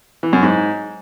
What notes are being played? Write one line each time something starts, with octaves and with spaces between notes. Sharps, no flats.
E3
F#2
G#2